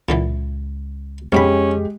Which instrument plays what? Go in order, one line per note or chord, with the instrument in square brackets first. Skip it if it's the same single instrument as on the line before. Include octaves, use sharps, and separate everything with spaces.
[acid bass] C#2 [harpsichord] A#2 D3 E3
[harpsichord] B1 G#2 B5 [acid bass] F2 [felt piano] G#3 G4 [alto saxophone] C#4